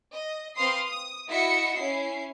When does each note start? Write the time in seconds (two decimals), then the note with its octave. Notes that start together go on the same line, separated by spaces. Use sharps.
0.12 D#5
0.55 C4 B4 F5 C6 D#6 C7
0.87 D#6
1.28 E4 F#4 D#5 E5 C#7
1.77 C#4 E4 C7